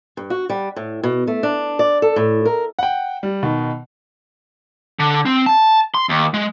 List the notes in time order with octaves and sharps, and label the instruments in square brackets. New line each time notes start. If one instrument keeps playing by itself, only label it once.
[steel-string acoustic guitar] G2
F#4
G3
A2
B2
A3
D4
D5
A4
A2
A#4
[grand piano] F#5 G5
G3
B2 D#3
[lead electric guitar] D3
C4
A5
C6
D#2
G#3